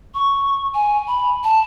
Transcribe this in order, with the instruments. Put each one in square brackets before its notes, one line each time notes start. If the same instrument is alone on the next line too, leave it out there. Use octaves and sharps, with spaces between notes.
[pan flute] C#6
G#5
B5
A5